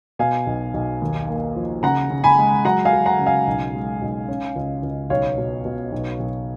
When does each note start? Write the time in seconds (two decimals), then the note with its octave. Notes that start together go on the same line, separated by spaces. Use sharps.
0.19 B2 F5 G#5
0.47 B1
0.74 B1
1.02 D#2
1.28 A#3
1.56 F3
1.83 C#3 F#5 A#5
2.10 C#3
2.24 G#5 B5
2.38 G#3
2.65 F#3 F#5 A#5
2.85 F5 G#5
2.93 F#3
3.06 F#5 A#5
3.19 C#3
3.26 F5 G#5
3.47 B1
3.75 G#3
4.02 B1
4.28 C#4
4.56 C#2
4.83 C#2
5.10 B1 C#5 F5
5.38 B2
5.65 B2
5.92 B1
6.20 B1